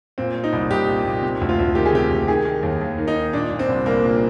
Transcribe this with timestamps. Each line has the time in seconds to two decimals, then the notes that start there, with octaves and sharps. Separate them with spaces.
0.18 A#2 C4
0.35 A#2
0.44 D#4
0.53 C2
0.71 C2 G4
0.88 A#2
1.05 A#2
1.23 C3
1.41 D2
1.49 F4
1.59 D2
1.75 D#3 G4
1.85 G#4
1.93 C3 G4
2.10 D2
2.28 D#3 G#4
2.45 D#3
2.63 D#2
2.81 D#2
2.98 D#3
3.08 D#4
3.16 D#3
3.33 A#2 D4
3.51 A#2
3.59 C4
3.69 C2
3.86 C2 A#3
4.03 A#2